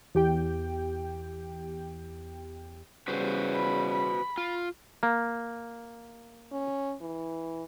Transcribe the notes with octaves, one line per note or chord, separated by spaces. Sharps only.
E2 G4 G5
E2 C#3 G3 F#4 B4 C5
B5
B5
F4
A#3
C#4
E3